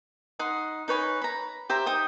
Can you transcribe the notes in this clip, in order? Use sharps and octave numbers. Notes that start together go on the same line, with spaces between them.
D#4 F#5 C6
D#4 B4 C#5 G#5
A#5 B5
G4 C5 E5 A#5
D#4 G5 D#6